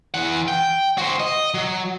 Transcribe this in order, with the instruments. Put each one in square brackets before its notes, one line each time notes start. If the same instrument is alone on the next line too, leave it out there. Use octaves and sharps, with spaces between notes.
[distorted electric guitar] E3 F#5
G5
F#4 C5
D#5
F#3